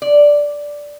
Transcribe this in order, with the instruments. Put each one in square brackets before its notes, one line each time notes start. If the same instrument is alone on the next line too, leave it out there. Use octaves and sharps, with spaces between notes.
[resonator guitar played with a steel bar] D5